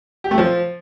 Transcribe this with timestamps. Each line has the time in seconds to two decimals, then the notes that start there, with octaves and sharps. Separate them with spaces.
0.24 G4
0.31 A3
0.38 F3